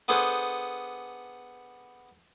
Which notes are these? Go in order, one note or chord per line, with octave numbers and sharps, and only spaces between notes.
B3 D4 G#4 A4 C5